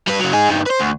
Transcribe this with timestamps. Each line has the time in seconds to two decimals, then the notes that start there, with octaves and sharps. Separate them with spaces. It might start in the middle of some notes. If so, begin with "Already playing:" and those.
0.07 G3 B4
0.19 C#3 F#3
0.33 D#4 G#4
0.49 G2 D#3
0.66 B4 C5
0.80 D2